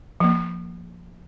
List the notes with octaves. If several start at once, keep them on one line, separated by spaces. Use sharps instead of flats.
F3 A#3